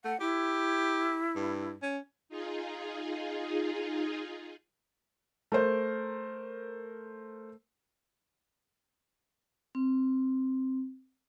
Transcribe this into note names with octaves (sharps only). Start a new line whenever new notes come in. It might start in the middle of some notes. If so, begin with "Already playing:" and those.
A3 F#5
E4 G4
G2
C#4
D#4 F4 G#4
A3 A#4 C5
C4